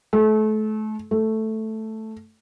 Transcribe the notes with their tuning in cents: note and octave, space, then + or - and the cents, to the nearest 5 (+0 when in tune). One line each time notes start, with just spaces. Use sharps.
A3 -30
A3 +0